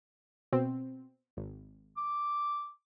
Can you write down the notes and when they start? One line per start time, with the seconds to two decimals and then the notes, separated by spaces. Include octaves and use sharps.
0.53 B2 C4
1.37 G#1
1.97 D6